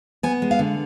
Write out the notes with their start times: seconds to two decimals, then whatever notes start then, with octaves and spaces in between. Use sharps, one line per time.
0.23 B3 G#5
0.42 G#3
0.51 F5
0.59 D3